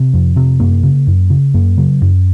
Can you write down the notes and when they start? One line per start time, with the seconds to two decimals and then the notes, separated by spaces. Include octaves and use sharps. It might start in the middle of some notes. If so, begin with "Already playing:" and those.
Already playing: C3
0.14 F2
0.36 C3
0.60 F#2 A#3
0.83 C#3
1.07 F#2
1.30 C#3
1.54 F#2 A#3
1.77 C#3 F#3
2.02 F#2